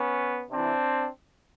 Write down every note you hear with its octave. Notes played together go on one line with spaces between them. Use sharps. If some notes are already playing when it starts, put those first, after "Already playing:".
Already playing: B3 C#4
C3 E3 C4 D4